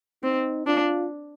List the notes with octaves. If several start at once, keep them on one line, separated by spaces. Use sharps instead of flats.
C4 D#4
D4 F4